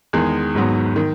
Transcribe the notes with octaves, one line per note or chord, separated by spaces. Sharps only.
E2 D#3 G#3
G#1 G#2 F#3 B3
D#3